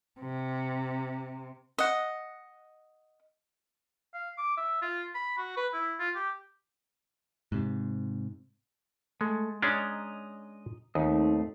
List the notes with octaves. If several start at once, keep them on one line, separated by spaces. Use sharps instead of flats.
C3
D#5 F#5
F5
D6
E5
F4
B5
F#4
B4
E4
F4
G4
G#2 C3
G#3 A3
G#3 C#4 D4 D#5 A#5
D#2 A3 C4 D#4 D#5